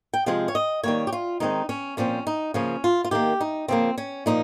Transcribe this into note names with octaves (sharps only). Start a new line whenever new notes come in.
G5
C3 F3 G#3 C4 F5
C#5
D#5
D#3 G3 A#3 C#5
G4
F4
D#3 G#3 C4 D#4
C#4
A#2 F3 C4 C#4
D#4
C#3 F3 A#3 C#4
F4
F4
D#3 A#3 G4
D#4
C#3 F3 A#3 C4
C#4
A#2 F3 A#3 D#4